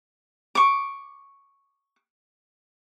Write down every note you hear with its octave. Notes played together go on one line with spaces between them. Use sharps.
C#6 D6